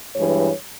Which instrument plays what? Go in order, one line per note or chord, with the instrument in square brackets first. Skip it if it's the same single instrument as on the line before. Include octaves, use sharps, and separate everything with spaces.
[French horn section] G2 E3 G#3 C#5